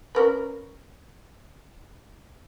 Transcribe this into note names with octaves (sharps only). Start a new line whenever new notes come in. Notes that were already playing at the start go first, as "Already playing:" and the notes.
C#4 A#4 B4